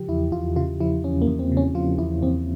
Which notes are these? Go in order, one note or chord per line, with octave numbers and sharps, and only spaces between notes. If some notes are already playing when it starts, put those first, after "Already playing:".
Already playing: C#3 F3 G4
E2 E4
E2 F4
C#3 F4
F3 E4
E2 C#4
A#3
E2
C4
C#3
C#4
F3 F4
E2 E4
E2 C4